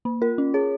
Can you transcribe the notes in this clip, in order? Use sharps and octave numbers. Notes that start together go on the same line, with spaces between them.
A#3
F4 A#4
C#4
G#4 C#5